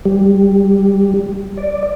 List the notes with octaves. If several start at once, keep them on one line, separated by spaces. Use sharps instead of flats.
G3
D5